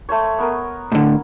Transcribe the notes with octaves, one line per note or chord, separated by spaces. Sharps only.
A3 C5 C#5
B3 A#4
A2 D3